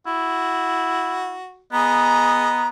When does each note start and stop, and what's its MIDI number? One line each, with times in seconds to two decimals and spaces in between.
0.06 1.40 64
0.06 1.62 66
1.73 2.69 59
1.73 2.67 68
1.73 2.67 75
1.73 2.68 82